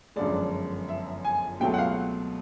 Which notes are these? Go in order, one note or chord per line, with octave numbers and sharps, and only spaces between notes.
G1 F#2 D3 F3 G#3 D5
E5
G#5
C#2 B2 F#3 A3 C4 G5
F#5
F5